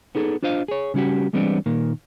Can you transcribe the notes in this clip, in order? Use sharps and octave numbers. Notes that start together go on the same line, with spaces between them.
B3 D#4 G#4 A4
D4 F4 C5 D#5 F5
G#4 C#5
C#3 G3 C#4 F#4 G4
E3 G3 G#3 B3 C4 D4
A#2 D#3 A#3